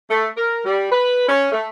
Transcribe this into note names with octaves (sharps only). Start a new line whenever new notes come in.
A3
A#4
G3
B4
C#4
A3